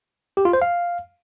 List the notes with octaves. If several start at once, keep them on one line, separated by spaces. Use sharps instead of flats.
G4
F4
C5
F5